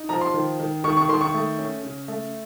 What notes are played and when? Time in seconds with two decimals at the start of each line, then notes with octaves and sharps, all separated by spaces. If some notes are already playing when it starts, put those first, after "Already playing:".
Already playing: D#4
0.09 F3 A#5
0.21 C6
0.34 D#3
0.60 D#3
0.84 D#3 C#6
0.97 C#6
1.09 D#3 C6
1.21 C#6
1.34 A3
1.59 C#4
1.83 C#3
2.08 A3